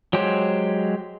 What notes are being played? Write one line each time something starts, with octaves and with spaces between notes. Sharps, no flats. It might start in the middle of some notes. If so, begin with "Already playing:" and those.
F#3 G#3 G4 C5